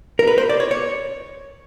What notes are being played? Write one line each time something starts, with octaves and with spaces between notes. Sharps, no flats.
A#4
B4
C5
D5
C#5
C#5